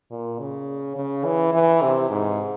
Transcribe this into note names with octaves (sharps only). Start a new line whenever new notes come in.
A#2
C#3
C#3
E3
E3
C3
G#2